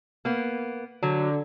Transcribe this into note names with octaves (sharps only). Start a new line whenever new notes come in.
A#3 B3
D3 F#3